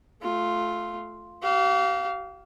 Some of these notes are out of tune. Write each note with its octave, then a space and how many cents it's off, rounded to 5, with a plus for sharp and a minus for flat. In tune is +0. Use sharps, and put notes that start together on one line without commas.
A3 -15 F4 +0
G4 -45 F5 +0